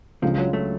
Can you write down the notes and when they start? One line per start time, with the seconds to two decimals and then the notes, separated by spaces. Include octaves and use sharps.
0.22 C#2 C#3 F3 G#3 D4 F4
0.38 F#3
0.53 F#3 A3